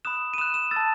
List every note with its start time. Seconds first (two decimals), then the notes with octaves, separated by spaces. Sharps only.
0.05 B5 D#6 F#6 E7
0.34 D#7
0.38 B5 D#6 F#6 E7
0.54 E7
0.71 E6 A6
0.76 A5